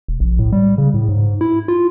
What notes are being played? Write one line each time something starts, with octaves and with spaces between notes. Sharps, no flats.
E1
A#1
A2
G3
C#3
A2
G#2
E4
F4